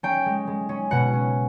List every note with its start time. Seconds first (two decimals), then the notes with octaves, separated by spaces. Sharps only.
0.03 C#4 G5
0.26 G#3
0.47 G#3
0.69 C#4
0.91 B2 F#5
1.13 C#4